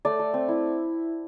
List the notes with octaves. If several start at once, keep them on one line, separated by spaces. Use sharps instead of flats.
A3 D5
A3
C4
E4